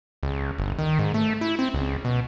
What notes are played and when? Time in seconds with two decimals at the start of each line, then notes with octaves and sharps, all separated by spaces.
0.23 C#2
0.58 G1
0.79 D#3
0.99 G#2
1.14 A3
1.41 E4
1.59 C4
1.74 C#2
2.05 B2